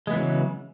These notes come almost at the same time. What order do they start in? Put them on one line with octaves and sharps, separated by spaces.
G#3 B3 E3 F#3 C#3